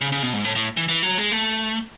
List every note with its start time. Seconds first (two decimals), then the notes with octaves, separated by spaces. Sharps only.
0.01 C#3
0.12 C#3
0.23 B2
0.33 G#2
0.45 A2
0.56 A2
0.77 E3
0.89 E3
1.03 F#3
1.18 G#3
1.32 A3